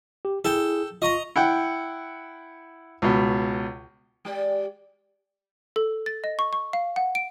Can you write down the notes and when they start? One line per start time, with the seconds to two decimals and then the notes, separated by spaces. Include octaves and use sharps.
0.25 G4
0.45 E4 G#4 A4 G5
1.02 F4 D#5 A#5 C#6
1.36 E4 F#5 G5
3.02 C#2 B2
4.25 G#3 G4 D5
5.76 A4
6.06 A6
6.24 D#5
6.39 C#6
6.53 C#6
6.73 F5
6.96 F#5
7.15 D7